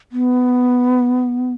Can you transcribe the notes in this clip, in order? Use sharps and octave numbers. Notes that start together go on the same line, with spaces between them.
B3